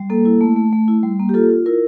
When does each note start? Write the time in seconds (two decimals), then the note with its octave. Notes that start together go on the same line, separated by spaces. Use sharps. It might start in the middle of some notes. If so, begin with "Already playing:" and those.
Already playing: G3
0.10 A#3 A4
0.25 E4
0.41 A3
0.56 A3
0.73 A3
0.88 E4
1.03 G3
1.20 A#3
1.29 G4
1.34 F4 A4
1.50 F4
1.66 E4 A#4